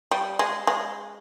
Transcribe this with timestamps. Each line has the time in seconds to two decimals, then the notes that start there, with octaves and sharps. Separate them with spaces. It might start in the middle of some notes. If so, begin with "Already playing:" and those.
0.11 G3
0.39 G#3
0.67 G#3